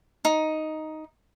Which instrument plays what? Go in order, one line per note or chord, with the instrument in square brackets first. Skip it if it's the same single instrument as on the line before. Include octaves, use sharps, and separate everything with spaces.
[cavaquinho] D#4